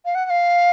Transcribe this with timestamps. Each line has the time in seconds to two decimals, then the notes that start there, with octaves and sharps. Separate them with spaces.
0.05 F5
0.15 F#5
0.26 F#5
0.30 F5